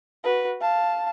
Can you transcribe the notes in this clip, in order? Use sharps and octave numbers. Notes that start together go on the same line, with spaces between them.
F#4 B4
F5 A5